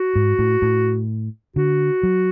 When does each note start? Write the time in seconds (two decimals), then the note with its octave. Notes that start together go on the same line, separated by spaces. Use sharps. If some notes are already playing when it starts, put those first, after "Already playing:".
Already playing: F#4
0.15 G#2
0.39 A2
0.62 A2
1.56 D3 F#4
2.03 F#3